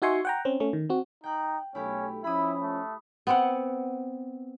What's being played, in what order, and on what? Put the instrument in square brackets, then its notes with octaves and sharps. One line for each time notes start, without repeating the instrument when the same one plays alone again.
[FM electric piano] D#4 F#4 E5 G#5 C6 C#6
F#5 G5 A#5
C4 C#4
A3 C#4
D#3
C4 F#4
[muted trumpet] D#4 [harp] G5 F#6
[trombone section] B1 A3 [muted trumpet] C#4 [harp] E4 G4
[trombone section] F3 C#4 [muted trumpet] E4 [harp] B5 D#6
[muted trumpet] A3
[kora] B3 C4 F#5